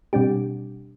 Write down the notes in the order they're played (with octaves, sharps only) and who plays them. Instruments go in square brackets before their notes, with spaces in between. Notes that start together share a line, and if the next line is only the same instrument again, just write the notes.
[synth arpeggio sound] B2 G3 C4 D4 G4